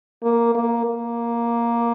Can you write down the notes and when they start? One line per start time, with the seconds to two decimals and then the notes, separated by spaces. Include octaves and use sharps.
0.23 A#3
0.55 A#3
0.86 A#3